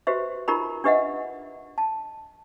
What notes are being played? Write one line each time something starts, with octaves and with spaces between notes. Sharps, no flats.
F#4 G4 B4 C5 E5
D#4 F4 G4 A#4 A#5 B5
D4 G4 B4 D#5 E5 F#5
A5